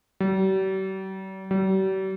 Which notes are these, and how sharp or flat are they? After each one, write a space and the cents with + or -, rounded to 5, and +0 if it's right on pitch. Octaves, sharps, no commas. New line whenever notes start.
G3 -45
G3 -45